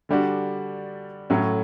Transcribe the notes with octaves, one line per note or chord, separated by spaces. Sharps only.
D3 G3 D4 F#4
A2 F#3 C#4